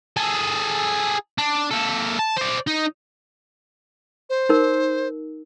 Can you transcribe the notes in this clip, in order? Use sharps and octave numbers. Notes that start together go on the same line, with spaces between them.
G#4 A4
D4
A#3 A4
A5
C5 D5
D#4
C5
D#4 A#4